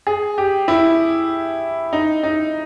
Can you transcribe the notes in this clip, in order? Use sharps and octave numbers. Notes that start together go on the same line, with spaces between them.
G#4
G4
E4
D#4
D#4